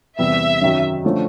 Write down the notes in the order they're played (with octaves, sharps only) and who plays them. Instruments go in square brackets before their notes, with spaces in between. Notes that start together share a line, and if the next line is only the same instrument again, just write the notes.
[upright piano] E2 C3 E3 G3 B3 [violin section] E5
[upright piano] F#2 D#3 F#3
D3 F3 A3 C#4